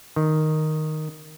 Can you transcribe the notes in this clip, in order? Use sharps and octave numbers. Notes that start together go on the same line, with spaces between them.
D#3